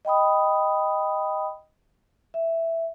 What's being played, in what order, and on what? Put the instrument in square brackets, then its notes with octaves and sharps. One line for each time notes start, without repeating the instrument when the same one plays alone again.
[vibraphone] D#5 G5 B5 D#6
E5